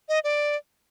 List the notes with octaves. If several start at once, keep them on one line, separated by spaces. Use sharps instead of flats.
D#5
D5